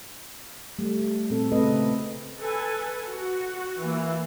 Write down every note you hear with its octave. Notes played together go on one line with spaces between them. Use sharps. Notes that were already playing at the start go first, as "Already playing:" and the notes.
G3 A3
A#2 C4 A4
C#3 A3 C4 A4 B4 D#5
A4 B4 G#5
F#4
E3 A#3